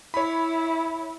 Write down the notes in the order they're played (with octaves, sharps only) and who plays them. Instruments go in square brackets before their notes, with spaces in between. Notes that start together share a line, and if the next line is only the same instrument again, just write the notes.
[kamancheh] E4 [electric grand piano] C#5 B5